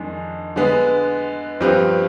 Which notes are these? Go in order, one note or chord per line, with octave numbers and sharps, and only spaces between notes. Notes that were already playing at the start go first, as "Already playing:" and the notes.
Already playing: F2 D#3 G#3 D4
D3 G#3 B3
G2 F3 C4 G4 B4